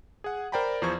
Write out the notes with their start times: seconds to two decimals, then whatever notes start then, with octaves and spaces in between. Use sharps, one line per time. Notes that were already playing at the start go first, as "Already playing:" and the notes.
0.24 G#4 F#5
0.52 A#4 C5 D5 G5 A#5 B5
0.82 E2 F3 C5 C#6 G#6